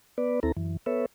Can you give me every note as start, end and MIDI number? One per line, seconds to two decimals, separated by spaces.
0.18 0.40 59
0.18 0.40 71
0.18 0.40 74
0.43 0.52 39
0.43 0.52 60
0.43 0.52 64
0.43 0.52 69
0.43 0.52 82
0.57 0.77 42
0.57 0.77 52
0.86 1.06 59
0.86 1.06 69
0.86 1.06 71
0.86 1.06 73
0.86 1.06 76